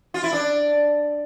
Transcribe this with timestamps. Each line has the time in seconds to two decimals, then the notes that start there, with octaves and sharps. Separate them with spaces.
0.14 F4
0.24 E4
0.33 D4